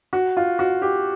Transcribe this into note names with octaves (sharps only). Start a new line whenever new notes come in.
F#4
F4
F#4
G4